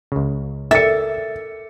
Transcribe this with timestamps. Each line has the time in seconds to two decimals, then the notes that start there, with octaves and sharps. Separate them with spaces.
0.12 C#2 C#3
0.71 A4 A#4 E5 A6 C#7